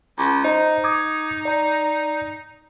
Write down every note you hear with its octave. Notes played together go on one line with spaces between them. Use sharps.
C#2
D#4 C5 D#5 A#5
D6 D#6 G#6
D5 A#5